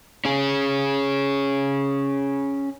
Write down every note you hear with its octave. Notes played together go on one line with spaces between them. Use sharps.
C#4 G#4